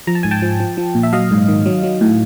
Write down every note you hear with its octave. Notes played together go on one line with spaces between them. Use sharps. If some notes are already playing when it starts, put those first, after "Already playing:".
F3 A#5
A5
G#2 G#5
G5 A5
F3
F3
F3
A#2
E5
F#3 D#5 F5
G#2
D#3
F#3
F#3
A2